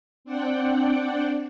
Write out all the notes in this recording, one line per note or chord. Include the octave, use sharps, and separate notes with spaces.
C4 D4 D5 F#5 G5